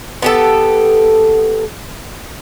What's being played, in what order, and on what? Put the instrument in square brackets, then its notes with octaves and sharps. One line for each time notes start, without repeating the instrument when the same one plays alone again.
[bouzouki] B3 G4 A4